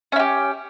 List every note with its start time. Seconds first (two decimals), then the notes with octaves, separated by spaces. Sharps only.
0.12 C#4
0.16 E4
0.19 G4